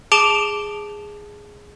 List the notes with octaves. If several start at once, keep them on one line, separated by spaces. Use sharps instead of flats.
G#4 A5 D6 D7 E7 G7